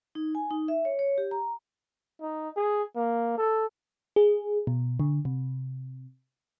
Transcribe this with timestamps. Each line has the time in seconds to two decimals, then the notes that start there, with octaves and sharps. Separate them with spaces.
0.15 D#4
0.35 G#5
0.51 D#4
0.68 E5
0.85 C#5
0.99 C#5
1.18 G4
1.31 A#5
2.21 D#4
2.56 G#4
2.96 A#3
3.37 A4
4.16 G#4
4.67 B2
5.00 D3
5.25 C3